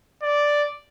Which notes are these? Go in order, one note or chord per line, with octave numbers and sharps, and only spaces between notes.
D5